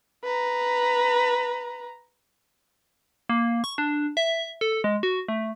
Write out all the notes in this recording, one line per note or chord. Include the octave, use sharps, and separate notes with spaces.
B4 A#5
A#3
C#6
D4
E5
A4
G#3
F#4
A3